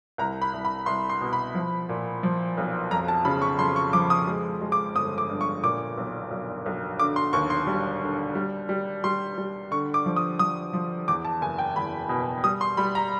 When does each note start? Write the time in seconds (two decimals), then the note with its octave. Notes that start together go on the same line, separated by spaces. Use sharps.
0.18 C2 A#5
0.42 B5
0.53 C2
0.65 B5
0.86 C2 C6
1.10 C6
1.21 B2
1.33 B5
1.55 F3
1.89 A#2
2.23 F3
2.57 B1
2.91 F2 A#5
3.08 A5
3.25 C#3 B5
3.42 C#6
3.59 F2 C6
3.76 C#6
3.93 F3 D6
4.10 D#6
4.27 G#3
4.61 G#3
4.72 D6
4.95 G1 D#6
5.18 D6
5.29 G2
5.41 C#6
5.63 A#2 D6
5.98 B1
6.31 B1
6.66 B1
6.99 D3 D6
7.16 C6
7.33 D#2 C#6
7.50 C6
7.67 G3
8.02 D3
8.35 G3
8.69 G3
9.04 G3 C6
9.38 G3
9.71 D3 C#6
9.94 D6
10.06 F3
10.16 D#6
10.39 F3 D#6
10.73 F3
11.08 E2 D6
11.25 A5
11.41 F#1 G#5
11.58 G5
11.76 E2 B5
12.09 B2
12.44 G3 D#6
12.61 C6
12.77 G3 B5
12.95 A#5